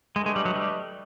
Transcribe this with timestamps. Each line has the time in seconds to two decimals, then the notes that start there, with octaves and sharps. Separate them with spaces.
0.16 G#3 A3 D4 G4 B4 D#5
0.26 G#3
0.36 G3
0.45 F#3
0.56 G3